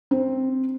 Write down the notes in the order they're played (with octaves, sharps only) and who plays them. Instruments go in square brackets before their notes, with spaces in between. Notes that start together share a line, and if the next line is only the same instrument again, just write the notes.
[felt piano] C4